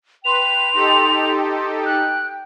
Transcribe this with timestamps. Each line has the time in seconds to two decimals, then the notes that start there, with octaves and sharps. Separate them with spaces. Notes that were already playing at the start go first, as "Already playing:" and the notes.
0.25 B4 G5 C6 F7
0.74 D#4 G4 A4
1.86 G5 F#6